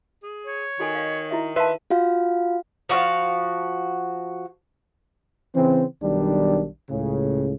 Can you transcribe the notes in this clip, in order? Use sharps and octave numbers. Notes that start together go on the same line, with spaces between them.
G#4
C#5
D#3 F#4 A4 G#5
D#5 F5
E4 F#4 E5
B4 E5 F5 A5 C6
F4 F#4 F5
F3 F#4 G#4 F5
C#3 E3 C4
B1 D#3 G3 D4
C#2 A2 C#3